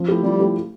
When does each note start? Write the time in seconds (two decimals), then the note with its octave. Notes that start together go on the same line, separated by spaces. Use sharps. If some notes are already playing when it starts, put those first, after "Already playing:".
Already playing: F3
0.08 A3 E4 G4
0.23 F3 G3
0.39 A3 E4 G4